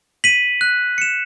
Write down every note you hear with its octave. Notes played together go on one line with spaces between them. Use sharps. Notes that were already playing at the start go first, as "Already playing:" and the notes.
B6 D#7 F#7
F#6
C#7 E7